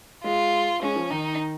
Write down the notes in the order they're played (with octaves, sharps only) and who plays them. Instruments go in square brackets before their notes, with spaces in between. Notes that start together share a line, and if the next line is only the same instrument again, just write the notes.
[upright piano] G#3 [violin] F4
[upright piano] G#3 [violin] C#4
[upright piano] F3
[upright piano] D#3 [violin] D#4